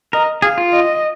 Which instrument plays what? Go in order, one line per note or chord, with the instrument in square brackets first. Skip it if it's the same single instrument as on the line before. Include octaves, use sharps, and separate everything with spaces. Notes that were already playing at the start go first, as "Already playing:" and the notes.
[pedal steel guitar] A#4 [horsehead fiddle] D#5
[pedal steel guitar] G#4 [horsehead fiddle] F5
[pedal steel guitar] F4
[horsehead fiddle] D#5